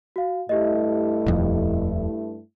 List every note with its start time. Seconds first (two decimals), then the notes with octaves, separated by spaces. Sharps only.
0.16 F#4 F5
0.49 G2 A3 E4 G4 D#5
1.26 D#1 F2